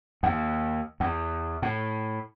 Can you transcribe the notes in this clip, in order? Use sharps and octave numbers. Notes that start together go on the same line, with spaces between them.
D#2
E2
A2